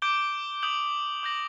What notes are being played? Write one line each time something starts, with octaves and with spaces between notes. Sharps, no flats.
D6 G6 D7 G7
D#6 G6 D7 F#7
D6 G6 A#6 F#7